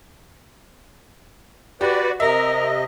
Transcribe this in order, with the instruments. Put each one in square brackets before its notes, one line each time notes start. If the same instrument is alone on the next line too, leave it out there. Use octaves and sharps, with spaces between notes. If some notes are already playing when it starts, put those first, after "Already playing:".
[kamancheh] F#4 [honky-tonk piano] G4 [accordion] B4 D5
[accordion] C3 D#5 [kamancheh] A#4 [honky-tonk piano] E5